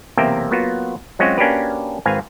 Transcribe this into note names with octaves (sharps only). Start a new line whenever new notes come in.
B1 E2 C3 A#3 E5 G5
F#3 A#3 B3 F4 F#4
F#3 G#3 C4 C#4 F4 F#4
A#3 C#4 D4 F#4 G4 B4
G#1 G#2 C4 B4 F5 G#5